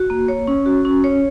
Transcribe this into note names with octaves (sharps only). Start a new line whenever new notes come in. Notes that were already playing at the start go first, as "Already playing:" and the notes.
Already playing: F#4
A#3
C#5
C#4
F#4
C#4
C#5